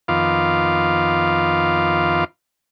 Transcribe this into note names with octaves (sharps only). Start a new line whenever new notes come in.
F2 D#3 B3 F4 F5 D6